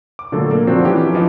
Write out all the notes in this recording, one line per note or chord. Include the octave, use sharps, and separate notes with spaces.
D6
A#2 D3 F#3 A3 A4
A#3
F3 F#3 C4 D4 F#4
E3 C#4 G4
E3 F3 D#5